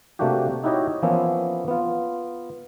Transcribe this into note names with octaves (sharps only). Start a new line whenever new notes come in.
C3 A3 A#3 D4 F#4 G4
D#4 E4 F#4 G4 C#5 D#5
E3 F3 A#3 B3 C#4 E4
B3 F4